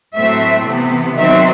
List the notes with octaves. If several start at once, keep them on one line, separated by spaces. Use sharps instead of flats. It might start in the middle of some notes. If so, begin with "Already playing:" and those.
A2 F#3 A3 C4 E5
C3 E3 B3
D#3 F#3 C4 E5